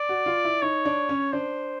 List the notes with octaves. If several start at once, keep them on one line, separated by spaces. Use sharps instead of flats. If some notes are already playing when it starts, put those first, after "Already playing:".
Already playing: D5
F#4
F4
E4
D#4 C#5
D4
C#4
D4 C5